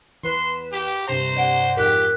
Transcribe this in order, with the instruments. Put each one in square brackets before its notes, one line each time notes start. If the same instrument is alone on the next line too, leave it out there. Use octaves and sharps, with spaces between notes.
[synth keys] E2 B4 E7 [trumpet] C6
[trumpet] G4
[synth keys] G2 C3 A#5 [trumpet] C5
[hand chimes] D5 F#5 D7
[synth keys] F2 G#2 [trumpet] G4 [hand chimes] A#4 F#6